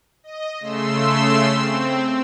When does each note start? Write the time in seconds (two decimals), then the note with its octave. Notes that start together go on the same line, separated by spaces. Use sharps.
0.24 D#5
0.60 C#3 A3 C6 E6
1.51 C4